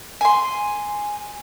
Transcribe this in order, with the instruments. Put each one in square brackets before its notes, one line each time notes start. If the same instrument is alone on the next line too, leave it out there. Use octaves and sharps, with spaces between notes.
[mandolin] G#5 C6